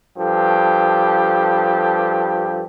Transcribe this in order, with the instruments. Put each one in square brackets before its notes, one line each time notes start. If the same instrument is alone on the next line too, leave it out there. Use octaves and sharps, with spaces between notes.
[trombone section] G2 F3 G4 A4